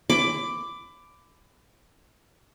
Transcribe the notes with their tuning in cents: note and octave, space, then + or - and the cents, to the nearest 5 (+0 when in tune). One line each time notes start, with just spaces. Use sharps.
B5 +25 D6 +0